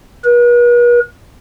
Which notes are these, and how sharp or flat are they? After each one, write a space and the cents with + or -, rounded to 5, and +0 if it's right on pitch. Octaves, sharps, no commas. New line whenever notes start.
B4 -45